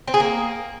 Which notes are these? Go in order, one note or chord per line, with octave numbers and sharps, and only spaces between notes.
C4
G#4
A#3